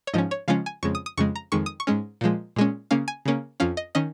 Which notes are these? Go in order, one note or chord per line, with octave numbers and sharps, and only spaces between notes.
C#5
G#2 F3 C#4 D#5
C#5
C#3 F3 G#3 C#4 F5
G#5
F2 C#3 G#3 C#6
D#6
D#6
F2 C#3 G#3 C#6
A#5
F2 D#3 G#3 C#6
D#6
C#6
G#2 G#3 C#4
A#2 F3 G#3
A#2 G#3 C#4
C#3 A#3 C#4 F5
G#5
C#3 A#3 C#4
F2 F3 C#4 F5
D#5
D#3 C#4 D#5